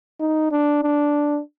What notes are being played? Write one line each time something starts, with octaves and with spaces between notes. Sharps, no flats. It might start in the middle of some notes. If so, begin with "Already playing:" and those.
D#4
D4
D4